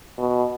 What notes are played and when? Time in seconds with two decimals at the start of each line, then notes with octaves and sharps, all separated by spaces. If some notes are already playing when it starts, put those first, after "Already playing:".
0.18 B2